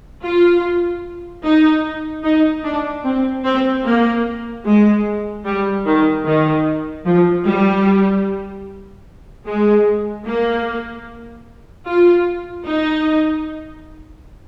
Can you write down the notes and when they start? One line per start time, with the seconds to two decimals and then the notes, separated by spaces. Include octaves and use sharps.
0.24 F4
1.44 D#4
2.23 D#4
2.64 D4
3.04 C4
3.44 C4
3.84 A#3
4.65 G#3
5.45 G3
5.85 D#3
6.25 D#3
7.05 F3
7.45 G3
9.46 G#3
10.25 A#3
11.86 F4
12.67 D#4